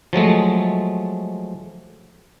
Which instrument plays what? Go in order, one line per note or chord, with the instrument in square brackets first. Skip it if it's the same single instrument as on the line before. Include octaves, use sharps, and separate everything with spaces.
[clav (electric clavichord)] F3 F#3 G#3 A3